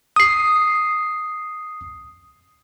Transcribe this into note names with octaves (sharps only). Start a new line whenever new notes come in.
D#6 C7